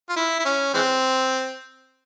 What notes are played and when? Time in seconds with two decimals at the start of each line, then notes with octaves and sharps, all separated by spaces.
0.10 F4
0.16 E4
0.39 E4
0.45 C#4
0.74 E3 G#3 C4